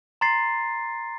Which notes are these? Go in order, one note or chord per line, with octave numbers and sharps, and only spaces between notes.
A#5 C6 A6 C7